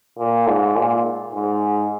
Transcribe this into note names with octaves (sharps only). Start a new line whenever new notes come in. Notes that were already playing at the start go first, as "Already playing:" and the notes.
A#2
G#2
A#2
G#2